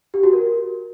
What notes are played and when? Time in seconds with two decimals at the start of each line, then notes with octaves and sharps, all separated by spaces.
0.14 G4
0.23 F#4
0.33 A#4